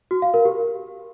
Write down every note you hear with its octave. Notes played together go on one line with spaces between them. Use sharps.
F#4
F5
A#4
G4